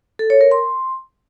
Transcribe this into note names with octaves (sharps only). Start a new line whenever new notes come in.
A4
C#5
A#4
C6